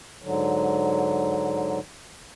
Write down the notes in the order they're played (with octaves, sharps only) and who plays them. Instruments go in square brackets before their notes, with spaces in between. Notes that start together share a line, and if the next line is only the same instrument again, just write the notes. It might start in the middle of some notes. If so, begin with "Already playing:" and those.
[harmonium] G#2 D3 F#3